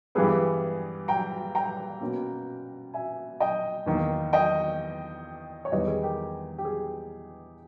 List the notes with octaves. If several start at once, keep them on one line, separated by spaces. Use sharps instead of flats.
G2 E3 G3 B3 G#4 B4
G5 A#5
G5 A#5
B2 A#3 C#4
E5 G#5
D#5 G5
E2 D#3 A#3
D#5 G5
C#5
E2 D#3 G3 B3 B4 D#5
G#4
G4 A#4
G4
G#4